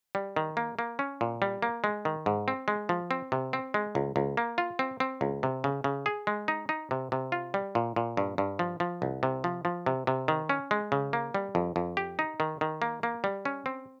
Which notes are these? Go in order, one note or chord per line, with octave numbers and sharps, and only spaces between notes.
G3
D#3
A#3
A#3
C#4
A#2
G3
A#3
G#3
D#3
G#2
C4
G#3
F3
C4
C3
C4
G#3
C#2
C#2
A#3
F4
C4
C4
C#2
C3
C#3
C#3
G#4
G#3
D#4
D#4
C3
C3
F4
G3
A#2
A#2
G2
G2
F3
F3
C2
C3
F3
F3
C3
C3
D#3
C#4
G#3
C#3
A#3
G3
F2
F2
G4
D#4
D#3
D#3
A#3
A#3
G3
C#4
C4